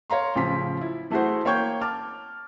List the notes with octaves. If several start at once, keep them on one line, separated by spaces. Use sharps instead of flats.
C#5 F5 A#5 C6
A1 C#3 F3 C6 B6
E4
E3 A3 E4 F#4 G#4 C5
A#3 C#5 G5 C#6 G6 G#6
A5 D6 F6